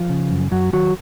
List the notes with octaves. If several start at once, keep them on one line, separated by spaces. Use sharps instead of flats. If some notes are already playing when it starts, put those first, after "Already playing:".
Already playing: F3 F4
C#3
F#2
F#2 F#3 F#4
D#3 F#3 F#4